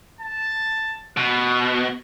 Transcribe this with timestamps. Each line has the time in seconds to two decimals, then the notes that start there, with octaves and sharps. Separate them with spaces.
0.21 A5
1.17 B2 F#6